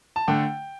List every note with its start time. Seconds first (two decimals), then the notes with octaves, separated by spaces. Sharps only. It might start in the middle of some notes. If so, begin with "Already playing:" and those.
0.16 A5
0.27 D3 A3 D4 G5